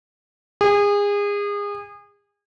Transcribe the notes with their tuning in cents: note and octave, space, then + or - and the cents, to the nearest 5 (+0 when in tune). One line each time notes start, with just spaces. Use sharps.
G#4 -30